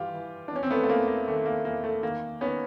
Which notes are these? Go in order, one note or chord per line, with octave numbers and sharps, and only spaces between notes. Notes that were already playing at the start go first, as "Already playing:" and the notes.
Already playing: G2 E3 F4 G4
E3
D4
E2 C#4
C4
A3 B3
A3
E2 A#3
A#3
D#3 A3
A#3
E2 A#3
A3
D#3 A#3
D#3 B3 C#4